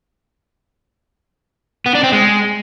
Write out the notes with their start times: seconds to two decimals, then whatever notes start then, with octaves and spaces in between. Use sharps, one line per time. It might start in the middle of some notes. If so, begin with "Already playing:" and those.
1.86 B3
1.95 D4
2.04 C4
2.13 G#3